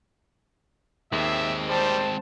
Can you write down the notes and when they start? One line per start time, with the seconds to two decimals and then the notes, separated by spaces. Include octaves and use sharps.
1.12 D#2 G#3 C4 E5
1.68 G3 C5 A5